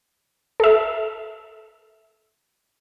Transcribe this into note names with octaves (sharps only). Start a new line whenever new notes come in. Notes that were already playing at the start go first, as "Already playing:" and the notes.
A4 E5